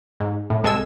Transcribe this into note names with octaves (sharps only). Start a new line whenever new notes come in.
G#2
A2
C2 G#3 A4 G#5 E6